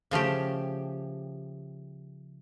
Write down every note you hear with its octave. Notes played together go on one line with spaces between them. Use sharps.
C#3 F3 A3 G4